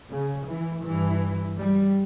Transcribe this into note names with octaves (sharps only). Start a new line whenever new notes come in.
C#3
E3
G2 E3
G3